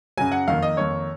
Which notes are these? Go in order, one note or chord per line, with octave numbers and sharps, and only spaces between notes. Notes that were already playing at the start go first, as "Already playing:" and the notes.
F#2 C#3 F#3 G#5
F#5
F2 D#3 A#3 F5
D#5
F2 D#3 A#3 C#5